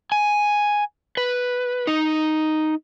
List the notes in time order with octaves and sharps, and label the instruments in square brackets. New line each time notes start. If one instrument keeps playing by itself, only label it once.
[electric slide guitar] G#5
B4
D#4